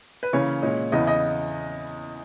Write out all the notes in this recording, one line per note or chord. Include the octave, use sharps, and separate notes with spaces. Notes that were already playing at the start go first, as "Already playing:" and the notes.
B4
C#3 E3 A#3 C#4 C#5
A#2 G#3 C#4
E2 C#3 E3 B3 D#5
D#5